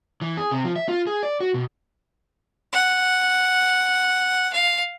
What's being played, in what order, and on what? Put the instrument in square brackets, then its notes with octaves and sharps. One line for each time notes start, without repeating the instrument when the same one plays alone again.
[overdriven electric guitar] E3
G#4
C3
F3
E5
F4
G#4
D5
F#4
B2
[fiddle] F#5
F5